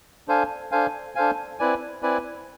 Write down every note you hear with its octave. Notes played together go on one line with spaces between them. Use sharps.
D4 A4 C5 F5 G#5
D4 A4 C5 F5 G#5
D4 A4 C5 F5 G#5
C4 E4 B4 D5 G#5
C4 E4 B4 D5 G#5